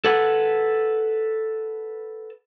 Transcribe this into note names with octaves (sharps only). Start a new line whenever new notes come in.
A4 B4 F#5